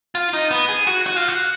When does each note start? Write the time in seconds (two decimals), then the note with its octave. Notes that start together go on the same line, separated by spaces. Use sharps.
0.15 F4
0.33 D#4
0.51 B3
0.69 G#4
0.87 F#4
1.06 F#4
1.16 F4
1.28 F#4